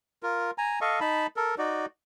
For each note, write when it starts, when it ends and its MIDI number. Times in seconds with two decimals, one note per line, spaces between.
0.23 0.51 65
0.23 0.51 70
0.58 0.79 80
0.58 0.79 82
0.81 1.00 69
0.81 1.00 75
0.81 1.00 77
0.81 1.00 85
1.01 1.27 63
1.01 1.27 81
1.01 1.27 83
1.36 1.55 69
1.36 1.55 70
1.58 1.86 63
1.58 1.86 66
1.58 1.86 74